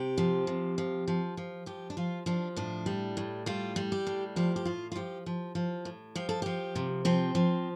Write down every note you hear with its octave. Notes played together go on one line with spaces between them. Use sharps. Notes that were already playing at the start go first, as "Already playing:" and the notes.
Already playing: C3 G4
F3
C3
F3
F3
F3
F3 G4
D4
F3 F4
F3 D4
A2 D4
G3
A2
G3 F4
G3
G4
A2
F3 G4
G4
A2 F4
F4
F3 G4
F3
F3
A2
F3 G4
A4
F3 G4
C3
F3 C4
F3